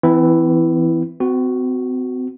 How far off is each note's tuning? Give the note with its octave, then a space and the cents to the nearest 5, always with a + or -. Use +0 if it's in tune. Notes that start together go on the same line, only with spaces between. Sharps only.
E3 +0 C4 -45 E4 +0
C4 -40 F#4 +0